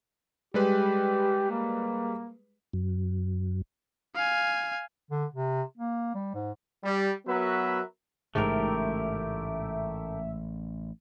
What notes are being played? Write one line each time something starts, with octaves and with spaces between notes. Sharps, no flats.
G3 G#3 G4 B4
A#3
F#2
F5 G#5
D3
C3
A#3
G3
G#2
G3
F#3 B3 F#4 A#4 B4 E5
A1 G#2 C#3 A3 G4 A#4 E5